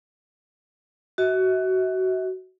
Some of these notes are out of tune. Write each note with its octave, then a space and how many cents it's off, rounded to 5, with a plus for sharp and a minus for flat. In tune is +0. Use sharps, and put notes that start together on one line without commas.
F#4 +20 E5 -40